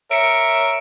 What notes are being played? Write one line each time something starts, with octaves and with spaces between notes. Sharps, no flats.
A#4 C#5 E5 C#7 D7